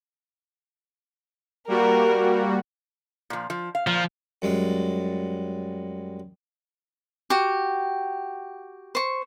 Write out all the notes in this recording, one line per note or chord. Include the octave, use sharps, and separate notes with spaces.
G3 A#3 F#4 A#4
A#2 F3
F3
F5
A#2 F3
F#2 G3 G#3
F#4 G4
C5 C#6